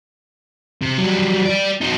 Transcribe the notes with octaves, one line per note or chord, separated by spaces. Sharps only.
C3
F#3 G3
G4 D5
D#4 F#4